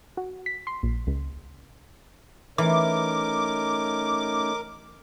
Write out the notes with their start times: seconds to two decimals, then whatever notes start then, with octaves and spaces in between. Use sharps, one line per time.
0.17 F#4
0.46 B6
0.67 C6
0.83 A#1
1.07 C#2
2.58 E3 A3 C#4 D#4 A#4 D6